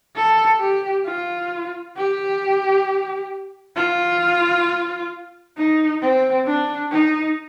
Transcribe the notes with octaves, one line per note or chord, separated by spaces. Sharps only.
A4
G4
F4
G4
F4
D#4
C4
D4
D#4